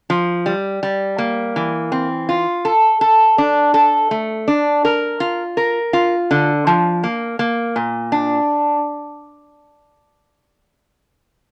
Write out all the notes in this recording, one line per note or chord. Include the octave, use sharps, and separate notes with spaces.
F3
G3
G3
A#3
E3
C4
F4
A4
A4
D4
A4
A3
D4
A#4
F4
A#4
F4
D3
F3
A#3
A#3
A#2
D4